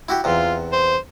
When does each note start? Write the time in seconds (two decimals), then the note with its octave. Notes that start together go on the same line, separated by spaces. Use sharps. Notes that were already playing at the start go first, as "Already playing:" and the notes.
0.09 E4 F#4 G4
0.24 E2 C3 F4
0.72 C5